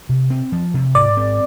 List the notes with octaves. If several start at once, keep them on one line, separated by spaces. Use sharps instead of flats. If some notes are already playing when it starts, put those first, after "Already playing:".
C3
C4
F3
C3
G#2 D5
C4